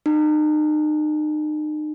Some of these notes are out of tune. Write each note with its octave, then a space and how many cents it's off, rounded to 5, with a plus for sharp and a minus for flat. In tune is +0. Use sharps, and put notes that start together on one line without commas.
D#4 -35